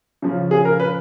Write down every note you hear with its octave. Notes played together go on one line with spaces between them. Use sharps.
C#3 F3
G#4
A#4
B4